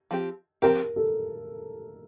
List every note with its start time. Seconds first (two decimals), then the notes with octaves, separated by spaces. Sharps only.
0.11 F3 C4 G4
0.62 F3 C4 G4 A#4
0.96 A4